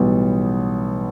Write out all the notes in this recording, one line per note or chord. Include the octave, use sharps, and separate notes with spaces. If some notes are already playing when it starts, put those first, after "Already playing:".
Already playing: B1 A2 E3 G3 B3